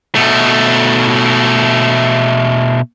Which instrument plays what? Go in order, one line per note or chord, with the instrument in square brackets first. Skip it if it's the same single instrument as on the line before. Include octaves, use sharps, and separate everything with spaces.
[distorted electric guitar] B2 A3